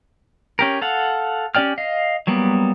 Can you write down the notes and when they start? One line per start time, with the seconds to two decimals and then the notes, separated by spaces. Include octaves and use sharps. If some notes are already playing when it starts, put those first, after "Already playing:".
0.59 C#4 G4 A#4
0.82 A4 F5 F#5
1.55 C#4 G4 D5 G5 F6
1.78 D#5 F5
2.27 F#3 G3 A#3 B3